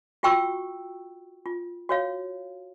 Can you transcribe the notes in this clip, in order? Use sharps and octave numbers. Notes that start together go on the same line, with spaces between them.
F4 F#4 G5 C#6 E6
F4
F#4 C#5 F5